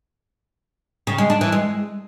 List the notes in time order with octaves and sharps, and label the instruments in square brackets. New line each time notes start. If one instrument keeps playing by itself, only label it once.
[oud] C#3
G#3
D4
E3
G#3